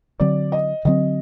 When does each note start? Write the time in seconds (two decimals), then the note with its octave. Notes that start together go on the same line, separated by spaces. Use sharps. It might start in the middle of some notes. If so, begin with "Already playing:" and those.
0.20 D3 F#3 C4 D5
0.52 D#5
0.85 D3 F#3 C4 D#5